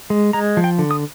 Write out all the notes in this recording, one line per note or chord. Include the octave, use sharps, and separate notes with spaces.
G#3
G#3 A#5
F3
G5
D3
D#6